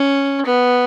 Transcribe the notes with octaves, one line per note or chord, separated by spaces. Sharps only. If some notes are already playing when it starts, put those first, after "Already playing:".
Already playing: C#4
B3